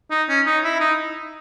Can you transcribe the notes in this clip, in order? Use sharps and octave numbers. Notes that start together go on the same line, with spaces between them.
D#4
C#4
D#4
E4
D#4